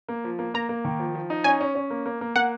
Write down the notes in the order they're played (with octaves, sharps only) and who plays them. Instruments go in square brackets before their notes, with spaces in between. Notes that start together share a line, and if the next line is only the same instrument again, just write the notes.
[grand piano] A#3
F3
A#3
[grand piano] A#3 [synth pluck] A#5
[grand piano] A#3
D#3
F3
F3
D#4
[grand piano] C#4 [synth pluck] G#5
[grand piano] C#4
C#4
A#3
A#3
A#3
[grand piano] A#3 [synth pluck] F#5